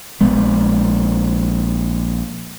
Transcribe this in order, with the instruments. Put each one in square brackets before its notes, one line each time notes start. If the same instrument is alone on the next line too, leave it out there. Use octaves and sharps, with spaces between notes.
[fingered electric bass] A#1 G#3 B3